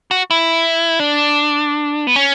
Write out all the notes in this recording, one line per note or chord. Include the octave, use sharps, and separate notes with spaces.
F#4
E4
D4
B3
C#4